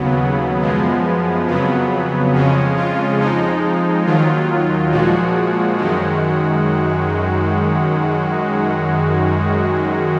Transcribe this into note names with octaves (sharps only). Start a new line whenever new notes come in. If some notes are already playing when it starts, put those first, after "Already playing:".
Already playing: D#2 C#3 F#3 B3
F#2 F3 G#3
F2 C#3 F#3 B3
F2 C#3 G#3 C#4
F4
F2 F3 G#3 D#4
D#2 D#3 F#3 F4
A#2 F3 G#3 F#4
F#2 D#3 G#3